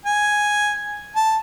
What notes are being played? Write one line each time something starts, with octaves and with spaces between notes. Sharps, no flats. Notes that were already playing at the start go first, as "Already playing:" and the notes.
G#5
A5